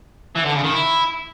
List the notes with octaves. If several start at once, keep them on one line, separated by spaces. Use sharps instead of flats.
E3
D3
C#3
D#3
E4